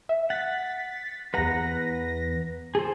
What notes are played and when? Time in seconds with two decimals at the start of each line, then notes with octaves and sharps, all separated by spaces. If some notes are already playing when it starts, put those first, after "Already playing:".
0.09 E5
0.30 F#5 A6 B6
1.34 E2 B4 F#5 A#5 A#6
2.75 G#4 A4 C5